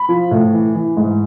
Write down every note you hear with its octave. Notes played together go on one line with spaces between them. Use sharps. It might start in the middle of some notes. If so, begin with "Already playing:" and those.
Already playing: B5
F3
A2
E3
E3
G#2